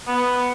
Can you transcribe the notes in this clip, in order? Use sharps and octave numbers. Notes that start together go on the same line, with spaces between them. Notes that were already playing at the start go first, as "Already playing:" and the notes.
B3